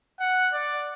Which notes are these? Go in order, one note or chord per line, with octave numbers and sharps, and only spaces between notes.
F#5
D5